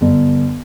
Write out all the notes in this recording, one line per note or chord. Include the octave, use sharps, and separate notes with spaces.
G1